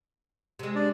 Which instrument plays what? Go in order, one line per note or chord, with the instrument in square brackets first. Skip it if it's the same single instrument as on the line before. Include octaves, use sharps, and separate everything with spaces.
[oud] C3 G#3
[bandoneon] D4 D5